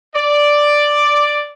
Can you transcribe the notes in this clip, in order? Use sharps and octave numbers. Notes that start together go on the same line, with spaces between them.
D5